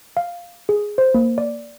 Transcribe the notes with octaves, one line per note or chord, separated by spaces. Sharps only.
F5
G#4
C5
A#3
D5